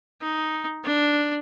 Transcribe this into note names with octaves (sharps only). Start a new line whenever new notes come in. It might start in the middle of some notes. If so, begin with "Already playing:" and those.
D#4
D4